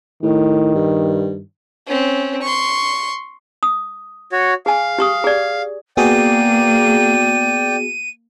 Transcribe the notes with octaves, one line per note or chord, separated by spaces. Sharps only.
A2 D#3
G2
C4 C#4
C6 C#6
D#6
F#4 C#5
G#4 F5 G#5
G4 C#6 D#6
G#4 D5
A#3 B3 F#4 G#4 D5 G5 D#7